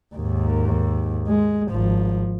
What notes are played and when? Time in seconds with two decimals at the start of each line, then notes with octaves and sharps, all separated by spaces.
0.15 D#2 G#2
1.28 G#3
1.71 G#1 F3